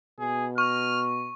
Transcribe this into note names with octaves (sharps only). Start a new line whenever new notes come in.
B2 G#4
C#6 F6